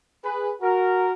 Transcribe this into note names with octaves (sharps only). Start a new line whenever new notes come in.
G#4 B4
F#4 A#4